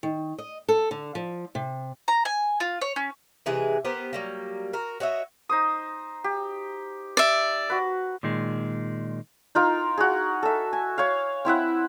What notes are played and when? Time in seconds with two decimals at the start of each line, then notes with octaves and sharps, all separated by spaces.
0.03 D#3
0.38 D#5
0.68 A4
0.91 D3
1.15 F3
1.55 C3
2.08 A#5
2.25 G#5
2.60 F4
2.81 C#5
2.96 C#4
3.46 C3 E3 G#3 G#4
3.85 B3 G4 A#4 C5
4.13 F#3 G3 A#3
4.73 F#4 A#4
5.00 F#4 C#5 D#5 E5
5.49 D#4 C5 D#6
6.24 G4
7.17 D5 E5
7.70 F#4 B4
8.23 A#2 D#3 G#3
9.55 D#4 F4 A#4
9.98 F#4 G#4
10.43 A4 E5
10.73 G#5
10.98 C#5 F5
11.45 C4 E4 E5 F#5